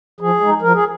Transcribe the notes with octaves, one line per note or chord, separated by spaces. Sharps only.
F3 G#4
G#3 D#4
F3 A#4
G#4